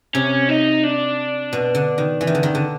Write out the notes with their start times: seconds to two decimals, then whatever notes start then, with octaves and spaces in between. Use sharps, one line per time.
0.15 C3 C#4
0.49 D#4
0.84 D4
1.53 B2
1.75 D3
1.98 D#3
2.21 E3
2.27 D#3
2.35 D3
2.43 D#3
2.55 D3